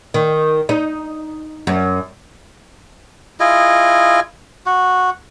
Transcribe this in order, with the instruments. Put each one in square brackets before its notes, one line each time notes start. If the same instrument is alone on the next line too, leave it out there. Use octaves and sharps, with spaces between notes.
[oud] D#3
D#4
F#2
[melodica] E4 F4 G#4 D#5
F#4